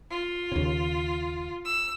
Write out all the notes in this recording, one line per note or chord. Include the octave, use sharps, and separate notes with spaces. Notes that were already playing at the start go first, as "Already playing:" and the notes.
F4
D#2 C#3
E6